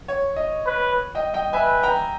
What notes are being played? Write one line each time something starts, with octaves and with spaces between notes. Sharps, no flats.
C#5
D#5
B4
D#5 G5
D#5 G5
B4 E5 G#5
G5 A#5